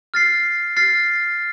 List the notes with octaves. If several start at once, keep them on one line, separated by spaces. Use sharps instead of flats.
F6 A6 C7
F6 A6 C7